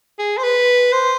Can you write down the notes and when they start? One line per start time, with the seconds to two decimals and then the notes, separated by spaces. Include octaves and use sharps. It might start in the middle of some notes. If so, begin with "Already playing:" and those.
0.19 G#4
0.38 C5
0.44 B4
0.93 C5